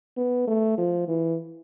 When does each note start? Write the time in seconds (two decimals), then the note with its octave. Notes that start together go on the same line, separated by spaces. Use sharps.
0.17 B3
0.48 A3
0.78 F3
1.08 E3